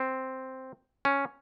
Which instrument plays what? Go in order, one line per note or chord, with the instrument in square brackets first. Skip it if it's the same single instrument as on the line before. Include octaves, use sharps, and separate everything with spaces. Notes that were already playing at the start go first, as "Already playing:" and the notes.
Already playing: [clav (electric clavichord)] C4
C#4